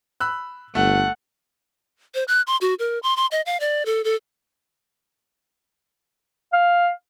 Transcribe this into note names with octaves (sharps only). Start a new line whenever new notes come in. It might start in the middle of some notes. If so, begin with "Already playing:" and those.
B5 E6 F#6
G1 A3 F#5
C5
F#6
C6
F#4
A#4
C6
C6
D#5
F5
D5
A4
A4
F5